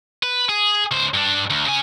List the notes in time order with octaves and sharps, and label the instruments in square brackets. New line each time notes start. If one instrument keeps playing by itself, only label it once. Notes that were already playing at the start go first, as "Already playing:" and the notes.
[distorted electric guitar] B4
G#4
C#2 C5
G2 D4
D2
C#3 G#5